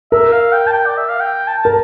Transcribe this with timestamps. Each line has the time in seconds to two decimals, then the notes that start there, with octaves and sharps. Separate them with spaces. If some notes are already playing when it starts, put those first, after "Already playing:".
0.12 A#4 E5
0.33 F5
0.53 G5
0.67 A5
0.73 G5
0.86 D5
0.97 E5
1.10 F5
1.20 G5
1.48 A5
1.63 A#4 A5